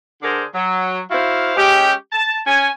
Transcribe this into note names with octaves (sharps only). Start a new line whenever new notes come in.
D3 D4 G#4 A#4 C5
F#3
E4 F#4 C5 F5
G#3 C#4 G4
A5
C#4 G#5